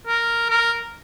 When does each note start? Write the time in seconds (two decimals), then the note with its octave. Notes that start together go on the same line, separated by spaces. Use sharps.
0.07 A#4
0.50 A#4